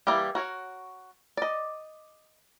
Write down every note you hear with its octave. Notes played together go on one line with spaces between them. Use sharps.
E3 G3 A#3 G4
F#4 A#4 C#5
D5 D#5